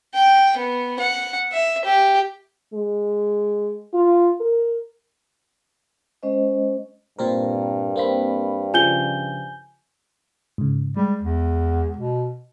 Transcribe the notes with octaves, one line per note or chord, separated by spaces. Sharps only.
G5
B3
F#5
E5
G4
G#3
F4
A#4
G#3 C#4 C5 D#5
G2 A#2 C4 A#4
A#3 C4 B5
C#3 F3 G#5 G6 G7
G#2 C#3
G3 G#3
E2
B2